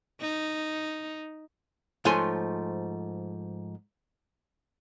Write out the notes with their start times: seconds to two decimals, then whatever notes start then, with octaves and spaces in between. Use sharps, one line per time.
0.21 D#4
2.05 G#2 F3 A3 C#5 G#5 C6